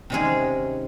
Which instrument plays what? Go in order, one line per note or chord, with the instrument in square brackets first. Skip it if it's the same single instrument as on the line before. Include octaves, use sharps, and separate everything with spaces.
[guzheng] C3 D#3 G#3 C#4 G#4